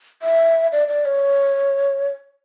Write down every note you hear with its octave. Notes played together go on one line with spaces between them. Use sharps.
E5
D5
D5
C#5